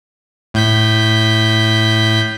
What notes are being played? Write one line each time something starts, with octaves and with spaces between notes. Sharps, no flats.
A2 G6 B6